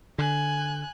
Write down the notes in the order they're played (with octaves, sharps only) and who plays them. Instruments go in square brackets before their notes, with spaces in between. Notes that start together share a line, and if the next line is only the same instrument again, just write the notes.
[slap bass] D3 [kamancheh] G#5 F#6